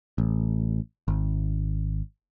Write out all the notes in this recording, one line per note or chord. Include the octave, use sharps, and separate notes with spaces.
A1
G#1